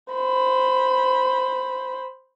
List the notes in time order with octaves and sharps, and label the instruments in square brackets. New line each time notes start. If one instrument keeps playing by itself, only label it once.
[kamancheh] C5 B5